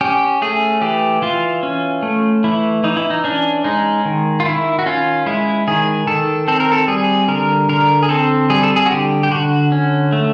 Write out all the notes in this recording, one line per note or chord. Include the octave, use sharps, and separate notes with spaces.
C#4 G4
A3 G#4
E3 G4
E3 F4
C#4
A3
E3 E4
E3 D#4
E4
D#4
C#4 D4
G#3 D#4
D#3
F4
D#3 E4
F#4
C#4 F4
G#3 E4
D#3 G#4
D#3 A4
C4 A4
A#4
A4
G3 G#4
D3 A#4
D3 A#4
G#4
C4 A4
G3 G#4
A4
G#4
F#4
D3 G4
G4
D3 F#4
C#4
A3